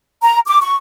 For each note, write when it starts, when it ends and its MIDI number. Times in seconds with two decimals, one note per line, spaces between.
0.23 0.38 82
0.48 0.58 86
0.61 0.76 85